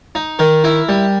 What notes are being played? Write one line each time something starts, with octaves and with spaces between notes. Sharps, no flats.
D#4
D#3 A#4
E4
G3